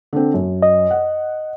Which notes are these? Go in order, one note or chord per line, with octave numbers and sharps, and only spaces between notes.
D3 C4
F#2
D#5
F#5